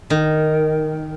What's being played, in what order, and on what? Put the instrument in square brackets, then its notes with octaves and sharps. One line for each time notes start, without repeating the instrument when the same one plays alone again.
[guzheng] D#3